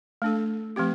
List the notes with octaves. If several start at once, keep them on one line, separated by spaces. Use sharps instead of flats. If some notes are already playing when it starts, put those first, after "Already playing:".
A3 D4 A4
F3 A3 C4 G4